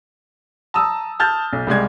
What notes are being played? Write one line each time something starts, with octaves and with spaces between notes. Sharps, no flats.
A5 A#5 D#6 E6
A5 F6 G6 A6
B1
C2 G3 G#3 G#6